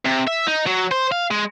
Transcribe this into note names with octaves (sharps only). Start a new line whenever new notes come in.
C3
E5
D#4
F#3
C5
F5
G#3